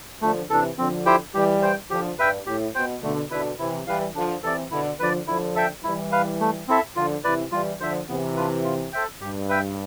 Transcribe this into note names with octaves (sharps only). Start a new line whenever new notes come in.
D3 F3 A3
C3 E3 D4 A4
D3 F3 C4
E4 G4 C5 G5
E3 G3 G4
C5 G5
D3 F3 G4
G2 B4 E5 G5
A2 G4
B2 C5 G5
B2 D3 A3
B2 D3 E4 B4 E5
C3 E3 E4
E3 G3 B4 F5
D3 F3 D4
C3 E3 A4 D5
B2 D3 E4
D3 F3 B4 D5
D3 F3 E4
A4 E5 G5
E3 G3 E4
B4 F5
A3
C4 E4 A4 E5
D3 F3 F4
C3 E3 B4 D5
E3 G3 F4
D3 F3 C5 E5
C3 E3 B3
D4 F4 B4
F4
A4 C5 E5 G5
G2 G4
B4 E5 G5